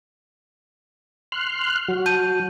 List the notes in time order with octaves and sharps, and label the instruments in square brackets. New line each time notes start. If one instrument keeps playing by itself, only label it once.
[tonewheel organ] C6 F6 F#6
F#3 F#4
[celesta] A5 G6 D#7